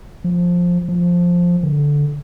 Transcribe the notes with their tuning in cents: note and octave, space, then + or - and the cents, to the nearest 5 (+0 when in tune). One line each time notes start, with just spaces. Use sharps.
F3 +10
F3 +5
D3 -10